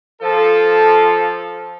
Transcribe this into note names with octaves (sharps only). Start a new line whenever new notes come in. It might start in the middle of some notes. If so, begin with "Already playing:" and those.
F3 A4